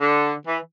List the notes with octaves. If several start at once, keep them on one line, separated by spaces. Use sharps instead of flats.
D3
E3